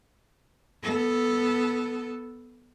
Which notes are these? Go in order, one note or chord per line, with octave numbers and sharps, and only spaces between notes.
B3 A4